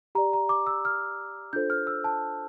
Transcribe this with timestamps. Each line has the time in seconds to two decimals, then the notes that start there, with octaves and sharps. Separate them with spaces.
0.15 G4 A#5
0.18 D5
0.33 A#5
0.49 D6
0.67 E6
0.85 F6
1.53 D4 F4 A4 C5 G6
1.70 F6
1.87 E6
2.04 A5